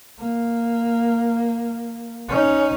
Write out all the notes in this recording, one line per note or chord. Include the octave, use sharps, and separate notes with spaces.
A#3
C#4 D#4